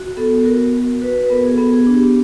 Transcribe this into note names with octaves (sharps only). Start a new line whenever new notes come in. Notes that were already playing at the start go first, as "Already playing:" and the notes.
Already playing: F#4
B3 A4
F#4 A#4
F#4
F#4 B4
B4
B3 A#4
G#4
A4
B3
G#4
D4
G4